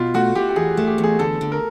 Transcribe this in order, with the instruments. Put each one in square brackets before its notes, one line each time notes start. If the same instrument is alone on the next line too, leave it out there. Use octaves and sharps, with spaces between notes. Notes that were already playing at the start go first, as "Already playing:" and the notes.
Already playing: [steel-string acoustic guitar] B2 [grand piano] F4
[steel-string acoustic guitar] A3 [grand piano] F#4
[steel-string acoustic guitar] A3 [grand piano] G4
[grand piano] G4
[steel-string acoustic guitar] E2 [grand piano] G#4
[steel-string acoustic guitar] A3
[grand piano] G4
[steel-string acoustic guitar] E2
[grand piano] G#4
[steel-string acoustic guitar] D3 [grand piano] A4
[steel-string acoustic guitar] D3
[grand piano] A#4